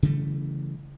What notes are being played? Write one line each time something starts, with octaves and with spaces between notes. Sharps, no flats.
C#3 E3 G3 A3